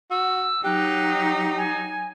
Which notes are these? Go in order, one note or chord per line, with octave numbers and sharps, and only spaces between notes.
F#4 E6
F#3 D#4 G4 F#6
G#5